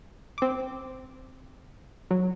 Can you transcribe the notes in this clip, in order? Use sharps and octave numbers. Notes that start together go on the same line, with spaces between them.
C4 D6
F#3